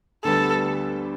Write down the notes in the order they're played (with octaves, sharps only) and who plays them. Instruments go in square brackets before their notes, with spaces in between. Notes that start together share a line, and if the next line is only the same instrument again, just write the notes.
[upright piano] D2 D3 G3 B3 [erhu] A4